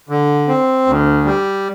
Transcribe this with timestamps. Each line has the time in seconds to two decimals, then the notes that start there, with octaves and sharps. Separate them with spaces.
0.09 D3
0.48 C4
0.87 D2
1.25 G3